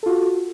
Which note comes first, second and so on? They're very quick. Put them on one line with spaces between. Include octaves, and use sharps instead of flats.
A4 F4 F#4